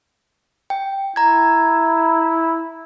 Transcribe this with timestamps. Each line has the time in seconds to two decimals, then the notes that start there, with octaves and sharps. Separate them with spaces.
0.70 G5
1.16 E4 A#5 G#6